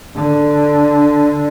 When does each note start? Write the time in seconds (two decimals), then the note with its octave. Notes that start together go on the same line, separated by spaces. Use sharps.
0.16 D3